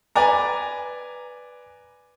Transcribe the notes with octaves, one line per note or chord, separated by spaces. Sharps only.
B4 D5 G#5 A#5